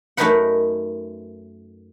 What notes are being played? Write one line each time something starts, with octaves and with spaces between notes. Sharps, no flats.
F#2 A3 D#4 A#4 B4 F#5